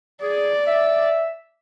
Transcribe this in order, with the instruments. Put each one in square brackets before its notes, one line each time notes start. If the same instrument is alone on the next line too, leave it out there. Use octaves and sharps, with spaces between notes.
[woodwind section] G#4 [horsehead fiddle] D5
[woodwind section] E5